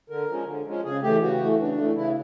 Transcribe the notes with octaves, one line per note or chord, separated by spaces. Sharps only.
D3 A#4
F3 G#3 C#4
D3
F3 G#3 C#4
C#3 G#4
E3 A3 G4
C#3 F#4
E3 A3
C#3 D4
E3 A3
C#3 E4